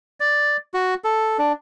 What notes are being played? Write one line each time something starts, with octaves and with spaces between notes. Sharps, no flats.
D5
F#4
A4
D4